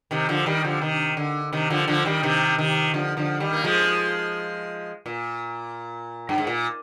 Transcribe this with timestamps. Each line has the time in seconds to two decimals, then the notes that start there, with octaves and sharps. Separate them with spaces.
0.11 C3 D#3
0.29 D3 F3
0.46 D#3 G3
0.64 D3 F3
0.81 C3 D#3
1.17 D3
1.53 C3 D#3
1.70 D3 F3
1.88 D3 F3
2.05 D#3 G3
2.23 C3 D#3
2.58 C3 D#3
2.94 D3 F3
3.17 D3 F3
3.40 D#3 G3
3.53 A#3
3.64 F3 G#3
5.06 A#2
6.29 G2
6.38 G#2
6.47 A#2